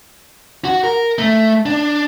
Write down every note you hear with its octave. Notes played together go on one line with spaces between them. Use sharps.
F#4
A#4
A3
D4